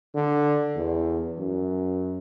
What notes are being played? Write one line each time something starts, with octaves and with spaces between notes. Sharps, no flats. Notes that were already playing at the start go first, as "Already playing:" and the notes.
D3
E2
F#2